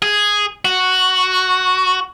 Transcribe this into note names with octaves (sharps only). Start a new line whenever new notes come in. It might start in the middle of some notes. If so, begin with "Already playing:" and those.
G#4
F#4